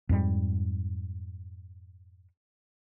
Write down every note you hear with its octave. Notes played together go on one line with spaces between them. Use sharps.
F2 G#2 G3